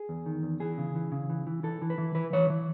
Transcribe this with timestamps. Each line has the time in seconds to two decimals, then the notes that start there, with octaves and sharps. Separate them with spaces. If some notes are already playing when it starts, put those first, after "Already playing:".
Already playing: G#4
0.09 E2
0.26 D#3
0.43 E2
0.60 E3 G#4
0.78 C#3
0.95 E3
1.12 C#3
1.30 E3
1.47 E3
1.63 E3 A4
1.82 E3
1.90 B4
1.98 E3
2.15 E3 B4
2.33 E3 C#5
2.50 E3